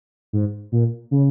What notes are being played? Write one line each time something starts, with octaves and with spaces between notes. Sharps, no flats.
G#2
A#2
C#3